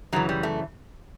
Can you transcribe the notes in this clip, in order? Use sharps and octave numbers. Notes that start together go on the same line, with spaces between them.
F#2 C#3 E3 F#3
G3
A3